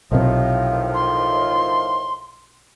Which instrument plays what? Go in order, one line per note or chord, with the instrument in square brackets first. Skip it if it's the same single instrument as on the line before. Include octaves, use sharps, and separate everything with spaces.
[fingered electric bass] B1 C3 [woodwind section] A2 D#3 F3
[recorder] C6